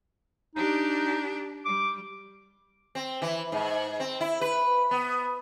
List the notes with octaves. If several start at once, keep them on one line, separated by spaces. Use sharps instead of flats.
D4 D#4 G4
G3 D6
C4
E3
G#2
C4
E4
B4
B3